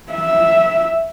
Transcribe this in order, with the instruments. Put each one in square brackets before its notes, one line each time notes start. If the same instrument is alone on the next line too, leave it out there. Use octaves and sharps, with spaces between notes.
[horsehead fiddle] E5